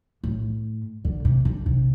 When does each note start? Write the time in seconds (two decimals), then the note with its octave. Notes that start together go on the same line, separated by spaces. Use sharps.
0.24 A2
1.05 D3
1.25 C3
1.45 D3
1.66 C3